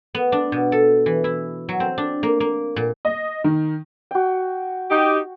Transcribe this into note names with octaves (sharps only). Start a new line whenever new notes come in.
B3
D4
B2
A4
E3
E4
F#3
C4
D4
A#3
A#3
A#2
D#5
D#3
F#4 G5
D#4 G4